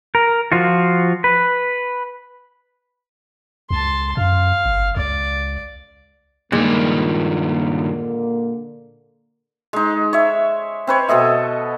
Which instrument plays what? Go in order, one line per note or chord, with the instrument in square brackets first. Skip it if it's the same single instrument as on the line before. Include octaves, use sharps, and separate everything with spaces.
[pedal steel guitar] A#4
F3 F4 F#4
B4
[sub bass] C#2 [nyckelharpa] A5 C6
[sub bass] F#2 [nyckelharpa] F5
[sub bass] G1
[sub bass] C#2 [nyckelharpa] D5
[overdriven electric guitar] G2 D#3 [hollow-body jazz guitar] A#2 G#3 [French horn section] D3 A#3
[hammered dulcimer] G#3 D#4
C#5 E5
C4 B4 C#5
B2 A4 D#5 E5